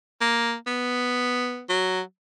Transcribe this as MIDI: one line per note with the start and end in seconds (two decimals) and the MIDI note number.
0.21 0.55 58
0.67 1.63 59
1.69 2.01 54